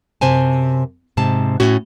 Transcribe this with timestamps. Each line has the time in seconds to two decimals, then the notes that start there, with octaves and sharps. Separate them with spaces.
0.21 F#2 C3 C5 G#5 A5
1.17 G#2 C3 A5
1.60 A2 C#4 F#4